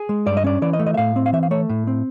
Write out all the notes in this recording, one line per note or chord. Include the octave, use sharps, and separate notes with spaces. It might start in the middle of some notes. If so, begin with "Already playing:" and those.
Already playing: G#4
G#3
G2 D5
D#5
C#4 D5
E3 D5
D#5
A3
D#5
E5
A2 F5
C4
F5
E3 E5
F5
A3 C#5
A2
C4